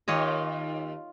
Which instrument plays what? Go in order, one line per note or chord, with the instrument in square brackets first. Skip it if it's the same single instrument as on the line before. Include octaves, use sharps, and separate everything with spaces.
[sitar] D#2 [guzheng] F4 C#5 D#5